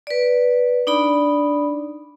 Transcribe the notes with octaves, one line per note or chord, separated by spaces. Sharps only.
B4 D5
D4 D#4 D5 B5